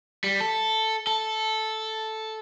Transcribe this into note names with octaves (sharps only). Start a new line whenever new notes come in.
G3
A4
A4